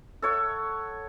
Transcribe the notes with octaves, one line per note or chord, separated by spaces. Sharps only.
A4 C#5 F#5